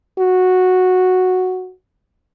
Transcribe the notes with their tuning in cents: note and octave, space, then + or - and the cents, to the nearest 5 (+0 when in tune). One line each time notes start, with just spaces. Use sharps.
F#4 -5